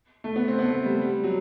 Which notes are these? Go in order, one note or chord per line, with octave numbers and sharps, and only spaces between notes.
A3
B3
C4
B3
A3
G3
G3
F#3